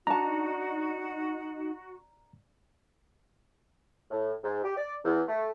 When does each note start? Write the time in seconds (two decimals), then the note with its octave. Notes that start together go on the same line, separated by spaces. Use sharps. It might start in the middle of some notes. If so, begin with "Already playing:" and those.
0.07 D4 D#4 F#4 A5 A#5
4.11 A2
4.44 G#2
4.64 G4
4.77 D5
5.04 E2
5.28 A3